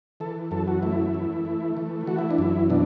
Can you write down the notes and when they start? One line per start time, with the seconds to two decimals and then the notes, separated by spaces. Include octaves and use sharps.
0.20 E3 A4
0.51 F#2 A4
0.68 F#4
0.83 A3 E4
1.14 E3
1.45 A3
1.77 E3
2.07 E3 F#4
2.18 E4
2.31 D4
2.38 F#2 E4
2.70 B2 D4